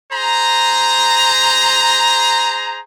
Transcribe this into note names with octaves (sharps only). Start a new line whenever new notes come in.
G#4 C5 A#5